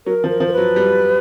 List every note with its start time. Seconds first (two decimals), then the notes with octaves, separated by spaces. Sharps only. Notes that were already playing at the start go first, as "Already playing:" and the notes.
0.06 F#3 A#4
0.24 F3
0.29 A#4
0.40 F3
0.48 A#4
0.53 F#3 B4
0.76 G3